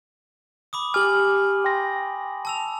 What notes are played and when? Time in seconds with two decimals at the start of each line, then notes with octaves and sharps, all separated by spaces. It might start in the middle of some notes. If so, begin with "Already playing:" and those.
0.73 B5 D6 D#6
0.94 G4 G#5 D6 F6 F#7
1.64 G5 C6 A#6
2.45 A5 E6 F7